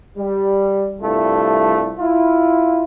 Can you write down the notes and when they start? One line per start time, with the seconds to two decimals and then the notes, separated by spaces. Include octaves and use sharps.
0.17 G3
1.01 C2 G2 A3 F4 A4
1.99 E4 F4